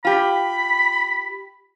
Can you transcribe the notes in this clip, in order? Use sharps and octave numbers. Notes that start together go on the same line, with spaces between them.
F4 G4 B5